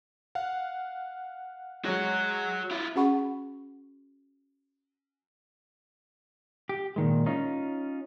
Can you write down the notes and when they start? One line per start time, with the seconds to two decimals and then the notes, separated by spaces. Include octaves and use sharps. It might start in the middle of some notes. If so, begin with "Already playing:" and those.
0.35 F5 F#5
1.85 F#3 G#3 F#4 C#5
2.71 E4 F4
2.96 C#4 F#4 G#4 F#5 B5 C#6
6.69 G4
6.96 A#2 D#3 G#3
7.26 C#4 D#4 F4